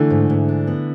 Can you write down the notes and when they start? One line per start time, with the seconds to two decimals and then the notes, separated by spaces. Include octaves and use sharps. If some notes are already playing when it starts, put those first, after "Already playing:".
Already playing: D3 E3 A3
0.10 G#2
0.30 G#2
0.49 D4
0.67 B3